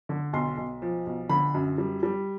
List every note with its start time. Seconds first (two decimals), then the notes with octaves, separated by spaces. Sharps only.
0.09 D3
0.33 B1 C6
0.57 B1
0.82 F3
1.07 B1
1.29 D3 B5
1.54 F#2
1.78 G3
2.03 G3